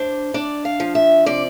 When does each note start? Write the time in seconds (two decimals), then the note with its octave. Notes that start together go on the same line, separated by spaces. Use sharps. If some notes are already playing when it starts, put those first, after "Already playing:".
Already playing: D4 C5
0.34 D4 D5
0.65 F5
0.80 F3
0.95 E5
1.26 C3 D5